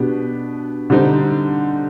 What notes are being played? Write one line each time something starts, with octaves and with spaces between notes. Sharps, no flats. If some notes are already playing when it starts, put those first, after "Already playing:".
Already playing: B2 B3 D4 G4
D3 G3 C4 D#4